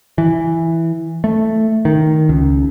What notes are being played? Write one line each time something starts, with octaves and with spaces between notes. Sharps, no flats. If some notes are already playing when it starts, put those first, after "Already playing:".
E3
A3
D#3
C#2